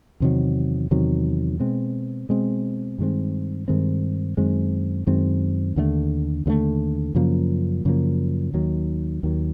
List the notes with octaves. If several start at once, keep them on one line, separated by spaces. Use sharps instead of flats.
E2 C3 D#3 F#3
E2 C3 D#3 F#3
B2 G#3 C4
B2 G#3 C4
G2 D#3 G#3 C4
G2 D#3 G#3 C4
F#2 D#3 G#3 C4
F#2 D#3 G#3 C4
D#2 D3 F3 A3
D#2 D3 F3 A3
F#2 C#3 F3 A#3
F#2 C#3 F3 A#3
D#2 D#3 F#3
D#2 D#3 F#3